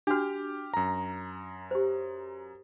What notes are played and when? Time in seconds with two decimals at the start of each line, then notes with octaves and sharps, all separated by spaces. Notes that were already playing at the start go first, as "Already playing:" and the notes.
0.07 D4 F#4 G4 F6
0.74 F#2 A#5
1.71 G4 C5